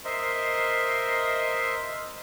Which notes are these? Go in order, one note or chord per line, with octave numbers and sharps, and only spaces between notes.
A#4 C5 D#5 E5 C6